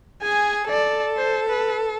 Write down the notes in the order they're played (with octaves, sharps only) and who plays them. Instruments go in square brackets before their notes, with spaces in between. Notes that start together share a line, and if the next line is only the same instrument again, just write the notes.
[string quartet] G#4 [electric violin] G#5
[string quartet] A4 [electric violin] D5
[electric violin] C5
B4